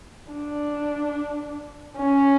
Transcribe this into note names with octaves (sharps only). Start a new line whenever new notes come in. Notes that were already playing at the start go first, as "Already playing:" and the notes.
D4
C#4